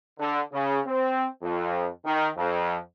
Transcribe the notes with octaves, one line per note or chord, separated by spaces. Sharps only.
D3
C#3
C4
F2
D#3
F2